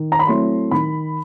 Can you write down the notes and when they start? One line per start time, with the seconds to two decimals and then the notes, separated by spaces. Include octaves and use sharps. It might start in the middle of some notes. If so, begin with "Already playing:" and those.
Already playing: D#3
0.12 A#5
0.19 B5
0.27 F#3 A3 C4 E4 C6
0.71 D#3 B5